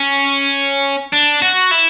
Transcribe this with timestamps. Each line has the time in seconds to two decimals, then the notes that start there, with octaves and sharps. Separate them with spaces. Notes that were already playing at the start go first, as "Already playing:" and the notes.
Already playing: C#4
1.13 D4
1.42 F#4
1.72 E4